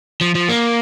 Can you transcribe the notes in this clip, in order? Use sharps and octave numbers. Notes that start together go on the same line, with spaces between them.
F3
F3
A#3